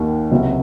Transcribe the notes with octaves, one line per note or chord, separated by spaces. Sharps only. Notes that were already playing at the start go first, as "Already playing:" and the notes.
Already playing: D#2 D#3 A#3 F#5
C#2 C3 F#3